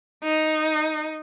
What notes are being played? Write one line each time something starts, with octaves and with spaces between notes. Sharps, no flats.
D#4